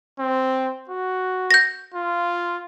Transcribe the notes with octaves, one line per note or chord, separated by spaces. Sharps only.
C4
F#4
G6 A#6
F4